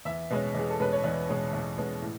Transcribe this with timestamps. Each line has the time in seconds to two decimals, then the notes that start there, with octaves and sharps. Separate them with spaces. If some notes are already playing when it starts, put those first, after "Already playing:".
0.05 E2 E5
0.30 B2 G#3 C#4
0.55 E2 G#4
0.70 A4
0.80 B2 G#3 C#4 B4
0.92 C#5
1.04 E2 D5
1.29 B2 G#3 C#4
1.53 E2
1.77 B2 G#3 C#4
2.02 A2